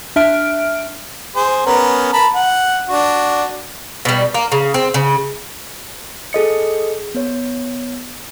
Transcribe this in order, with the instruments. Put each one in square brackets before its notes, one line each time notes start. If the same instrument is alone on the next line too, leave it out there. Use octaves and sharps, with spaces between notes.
[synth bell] D4 E5 F6 D7
[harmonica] G#4 C5
B3 C#4 A#4
A#4 A5 B5
F#5
D4 F#4
[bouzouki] B2 G3
A#3
C#3
C4
C#3
[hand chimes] G#4 A4 D#5 C#7
B3 C#5